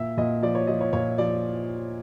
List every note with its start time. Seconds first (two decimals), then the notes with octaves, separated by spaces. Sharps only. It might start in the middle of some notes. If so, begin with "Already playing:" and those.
Already playing: A#2 E5
0.17 A#2 D#5
0.42 F3 D5
0.55 C#5
0.67 F3 D#5
0.81 C#5
0.93 A#2 C#5
1.18 F3 D5